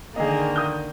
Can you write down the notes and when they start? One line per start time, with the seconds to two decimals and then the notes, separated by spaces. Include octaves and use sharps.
0.16 D3 D#3 A#3 G#4 D#5
0.56 D#6 G6